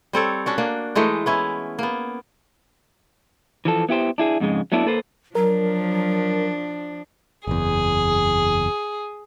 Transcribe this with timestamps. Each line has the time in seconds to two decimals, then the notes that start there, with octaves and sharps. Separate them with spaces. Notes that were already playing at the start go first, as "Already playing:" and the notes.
0.13 G3 C4 A4 C#5
0.46 C#4 D4 F#4
0.58 A#3 D4
0.95 E3 G#3 A3 D#4
1.26 B3 C#4 E4
1.79 A#3 B3
3.65 E3 F3 A4
3.89 B3 E4 G4 C5
4.18 D4 E4 G#4
4.40 F2 G#2 C#3 G#3
4.72 F#3 A3 B3 D4 E4
4.86 A#3 A4 B4 C5
5.35 F3 F#3 D4 A#4
7.47 F#1 E2 G#4